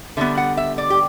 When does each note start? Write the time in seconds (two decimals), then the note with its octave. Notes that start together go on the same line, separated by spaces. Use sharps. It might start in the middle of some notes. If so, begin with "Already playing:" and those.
0.17 D3 G3 B3 E5
0.37 F#5
0.57 E5
0.78 D5
0.90 G4